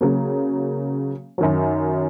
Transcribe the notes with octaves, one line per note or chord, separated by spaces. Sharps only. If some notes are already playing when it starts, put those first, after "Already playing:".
C#3 F#3 A#3
F#2 D#3 F#3